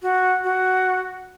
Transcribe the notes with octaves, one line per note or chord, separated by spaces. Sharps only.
F#4
F#4